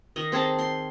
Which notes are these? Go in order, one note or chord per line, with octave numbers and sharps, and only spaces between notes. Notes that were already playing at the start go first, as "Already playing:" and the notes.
D#3 D#5
C4 G#4 A4 A5
C6